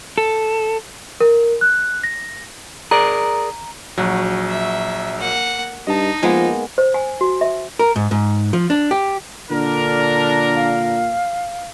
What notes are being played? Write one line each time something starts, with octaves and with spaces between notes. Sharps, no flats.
A4
A#4
F#6
A#6
G#4 A#4 D5 A#5
A#1 F#3 F#4
E5
A#3 F#5
G2 D#4 D#5 A5
F3 G#3 A#3 B3
C5
G#5
F#4
E5
A#4
G#2
G#2
F3
D4
G4
A#2 D3 D4 A#4
F5